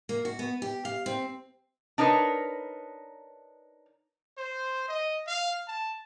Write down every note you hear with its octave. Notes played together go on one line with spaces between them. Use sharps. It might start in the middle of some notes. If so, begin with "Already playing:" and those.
A#3
F#4
B3
G4
F5
C4
D4 D#4 A#4 B4 C#5
C5
D#5
F5
A5